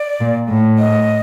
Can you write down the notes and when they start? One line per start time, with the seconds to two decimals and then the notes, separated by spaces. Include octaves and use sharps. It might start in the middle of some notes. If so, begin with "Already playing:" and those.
Already playing: D5
0.21 A#2
0.50 A2
0.78 D#5